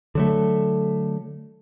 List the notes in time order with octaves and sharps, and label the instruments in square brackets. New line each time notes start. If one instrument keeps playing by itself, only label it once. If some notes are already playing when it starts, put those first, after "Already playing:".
[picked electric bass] D3 F#3 A3